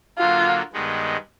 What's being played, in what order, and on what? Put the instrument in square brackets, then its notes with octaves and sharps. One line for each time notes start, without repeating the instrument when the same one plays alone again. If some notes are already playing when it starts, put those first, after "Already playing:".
[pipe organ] D3 F#3 A#3 [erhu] F4
[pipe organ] G2 D#3 G#3 B3